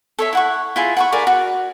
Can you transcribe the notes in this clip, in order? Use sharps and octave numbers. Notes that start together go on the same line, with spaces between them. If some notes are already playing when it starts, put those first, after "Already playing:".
A4 C#5 E5
E4 F#5 C#6
E4 F4 G#4
F#5 B5 C#6
E4 G#4 A#4 D5
F#4